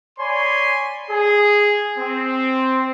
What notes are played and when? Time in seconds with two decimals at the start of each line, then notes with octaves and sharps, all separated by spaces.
0.19 C#5 D5 G#5 B5 C6
1.10 G#4
1.98 C4